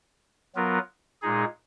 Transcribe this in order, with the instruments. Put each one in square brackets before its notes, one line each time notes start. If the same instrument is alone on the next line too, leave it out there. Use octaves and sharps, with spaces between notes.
[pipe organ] F#3 B3 F4 A#4
A#2 G#3 D#4 G#4